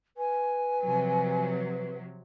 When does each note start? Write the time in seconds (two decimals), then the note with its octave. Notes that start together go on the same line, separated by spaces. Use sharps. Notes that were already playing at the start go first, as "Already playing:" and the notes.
0.17 B4 G#5
0.82 C3 F3 F#3